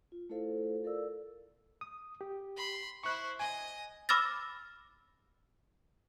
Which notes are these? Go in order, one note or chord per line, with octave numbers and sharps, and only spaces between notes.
F4
A3 E4 F4 A4 C5 F5
A4 A#4 D5 F5 E6
D#6
G4
B5 C6
E4 C5 C#6 F#6
D#5 G#5
B5 D6 E6 F6 A6 A#6